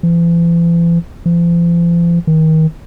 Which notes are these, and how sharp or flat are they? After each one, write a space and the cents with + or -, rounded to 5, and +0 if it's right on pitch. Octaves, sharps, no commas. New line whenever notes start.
E3 +45
F3 -40
D#3 +30